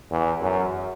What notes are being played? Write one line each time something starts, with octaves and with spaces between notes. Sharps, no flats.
E2
F#2